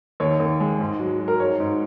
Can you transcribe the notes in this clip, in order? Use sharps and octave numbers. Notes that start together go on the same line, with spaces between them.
D#2 C#5
D#2
G#3
G#2
F#3
F#3
A#4
G#2 C#5
G#2